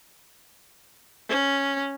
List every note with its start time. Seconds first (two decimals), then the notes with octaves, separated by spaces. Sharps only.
1.29 C#4